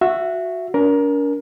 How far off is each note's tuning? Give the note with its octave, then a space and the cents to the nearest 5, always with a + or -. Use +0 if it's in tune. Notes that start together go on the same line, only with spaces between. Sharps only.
F#4 -10 E5 +15
D4 -45 A#4 +15